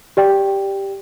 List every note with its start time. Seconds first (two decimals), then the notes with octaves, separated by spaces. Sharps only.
0.17 G4 D5 G5